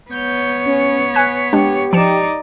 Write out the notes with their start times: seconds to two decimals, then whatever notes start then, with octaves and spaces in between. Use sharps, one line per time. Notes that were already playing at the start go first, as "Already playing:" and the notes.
0.11 B3 C#5 G6
0.66 C#4
1.14 G#5 F#6 G#6 B6
1.53 G#3 D4 G4
1.93 F3 D#4 D5 C#7 E7